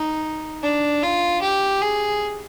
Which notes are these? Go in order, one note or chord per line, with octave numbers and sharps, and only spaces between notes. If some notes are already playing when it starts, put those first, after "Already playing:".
Already playing: D#4
D4
F4
G4
G#4